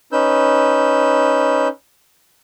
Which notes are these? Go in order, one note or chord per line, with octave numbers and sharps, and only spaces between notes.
C#4 D#4 B4 E6 G6